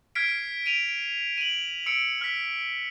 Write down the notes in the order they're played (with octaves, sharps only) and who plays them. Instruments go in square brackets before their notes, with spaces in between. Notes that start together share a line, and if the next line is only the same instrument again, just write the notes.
[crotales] F6 G#6 B6 C7 D7
D7 D#7 F7
D7
D#7 F#7
E6 C#7 D7
F6 B6